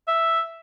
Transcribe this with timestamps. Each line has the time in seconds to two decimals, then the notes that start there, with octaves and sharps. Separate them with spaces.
0.08 E5